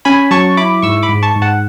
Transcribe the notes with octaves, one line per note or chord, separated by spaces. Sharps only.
C#4 G#5 B5
F#3 A5 C#6
E4 B5 D6
G#2 C#6 E6
B5 D6
G#2
A5 C#6
G#2
F#5 A5